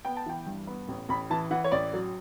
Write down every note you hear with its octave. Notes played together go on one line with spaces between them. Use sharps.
B3 G5
A5
E3 G5
G2
B3
A1
A1 B5
E3 A5
E3 F#5
C#5
A1 D5
F#3